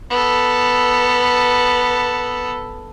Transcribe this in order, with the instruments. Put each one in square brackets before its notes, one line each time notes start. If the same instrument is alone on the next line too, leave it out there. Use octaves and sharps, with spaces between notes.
[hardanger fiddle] B3 A4